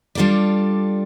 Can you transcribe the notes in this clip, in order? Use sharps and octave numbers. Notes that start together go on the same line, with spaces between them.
G3 D4 F4 A4 D5